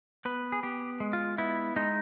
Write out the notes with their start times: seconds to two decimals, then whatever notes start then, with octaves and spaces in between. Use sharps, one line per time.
0.25 B3 B4
0.52 G#4
0.63 B3 G4
1.00 G#3
1.13 F4
1.38 B3 E4
1.76 G#3 D#4